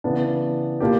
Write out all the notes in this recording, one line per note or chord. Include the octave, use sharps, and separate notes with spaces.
C#3 E3 B3 D4
A#2 A#3 D4 G4